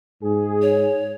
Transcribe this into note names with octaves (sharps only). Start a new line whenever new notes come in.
G#2 G#4
C#5